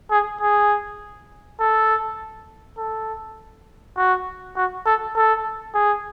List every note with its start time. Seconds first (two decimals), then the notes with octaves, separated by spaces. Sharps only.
0.11 G#4
0.41 G#4
1.60 A4
2.78 A4
3.97 F#4
4.57 F#4
4.86 A4
5.16 A4
5.75 G#4